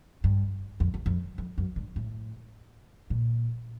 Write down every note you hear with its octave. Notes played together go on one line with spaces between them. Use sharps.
G2
F2
E2
F2
F2
F#2
G2
A2
A#2